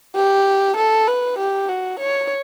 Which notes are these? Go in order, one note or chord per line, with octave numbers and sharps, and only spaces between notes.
G4
A4
B4
G4
F#4
C#5